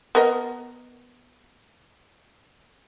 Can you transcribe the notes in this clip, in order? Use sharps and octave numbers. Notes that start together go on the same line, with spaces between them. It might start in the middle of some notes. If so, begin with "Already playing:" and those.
B3 A#4 D#5